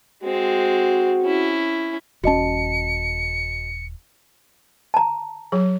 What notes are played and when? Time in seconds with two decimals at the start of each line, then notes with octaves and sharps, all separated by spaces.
0.24 G#3 C4 F#4
1.22 C#4 E4
2.24 D#1 C#4 F#4 D#5 A5 C#7
4.94 A5 A#5
5.52 F#3 G#4